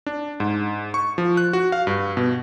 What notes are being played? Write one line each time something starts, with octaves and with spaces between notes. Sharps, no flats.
D4
G#2
C#6
F3
F#6
F#4
F5
G2
B2